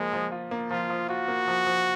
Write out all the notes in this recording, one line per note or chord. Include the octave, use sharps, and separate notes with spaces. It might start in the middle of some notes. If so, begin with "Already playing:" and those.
Already playing: F3 G#3 A#3
F3
F4
A#3
F3 F4
F3
F4 F#4
A#3
F3
F3